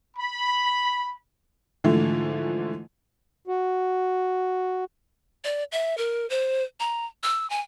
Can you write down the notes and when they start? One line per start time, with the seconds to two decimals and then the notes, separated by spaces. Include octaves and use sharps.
0.17 B5
1.84 G#2 D3 E3 F3 A3
3.48 F#4
5.44 D5
5.72 E5
5.98 A#4
6.30 C5
6.80 A#5
7.23 E6
7.50 G#5